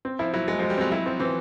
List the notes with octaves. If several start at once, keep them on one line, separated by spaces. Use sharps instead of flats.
C4
F3 E4
F#3 E4
F#3 G#3
F3 G#3
G3
F#3 C4
F#3 E4
F3 C4
E3 C4